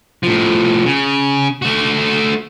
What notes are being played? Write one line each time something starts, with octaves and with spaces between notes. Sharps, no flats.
A2 F3
C#3
A3 F#4